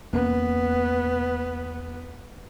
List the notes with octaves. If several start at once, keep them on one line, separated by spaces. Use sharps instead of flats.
E2 A#3 B3 C#4